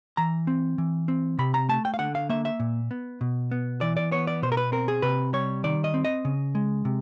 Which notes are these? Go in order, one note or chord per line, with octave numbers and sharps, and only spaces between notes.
E3 A#5
C4
E3
C4
C3 B5
A#5
A3 A5
G5
F5
D3 F#5
F5
A#3 E5
E5
A#2
B3
B2
B3
E3 D5
D5
B3 C#5
D5
B2 C5
A#4
B4
C4 A#4
G#4
C3 B4
G3 C#5
D#3 D5
D#5
C4
D#5
C#3
G#3
C3